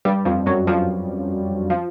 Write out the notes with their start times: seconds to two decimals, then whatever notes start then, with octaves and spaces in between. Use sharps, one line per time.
0.05 G2 G3
0.25 F2 F3
0.46 F#2 F#3
0.67 F2 F3
1.70 F3